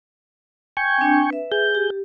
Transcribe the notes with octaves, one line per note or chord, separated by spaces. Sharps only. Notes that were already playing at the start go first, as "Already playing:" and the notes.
G5 G#5 C#6
C4 D4
B4 E5
G#4 G6
G4